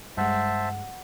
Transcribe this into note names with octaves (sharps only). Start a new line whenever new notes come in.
G2 G#3 C5 E5 F#5 A5